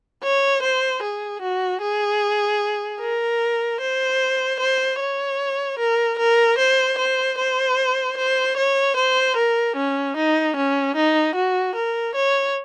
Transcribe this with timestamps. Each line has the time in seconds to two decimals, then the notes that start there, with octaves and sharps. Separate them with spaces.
0.23 C#5
0.62 C5
1.02 G#4
1.42 F#4
1.81 G#4
3.01 A#4
3.81 C5
4.60 C5
5.00 C#5
5.79 A#4
6.19 A#4
6.59 C5
6.98 C5
7.38 C5
8.18 C5
8.57 C#5
8.97 C5
9.37 A#4
9.77 C#4
10.17 D#4
10.56 C#4
10.96 D#4
11.35 F#4
11.75 A#4
12.15 C#5